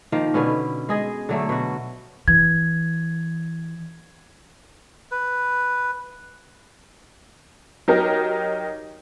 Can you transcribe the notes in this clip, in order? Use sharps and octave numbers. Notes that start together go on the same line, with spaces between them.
D#3 F3 A#3
B2 D3 B3 C#4
G#3 G#4 D#5
D3 F#3 A3
B2 F#4
E3 G#6
B4
F#3 D#4 G4 A#4